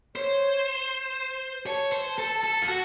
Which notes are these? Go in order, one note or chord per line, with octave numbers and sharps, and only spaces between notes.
C5 C#5
C#5 A5
C5
A4
A4
F4
F#4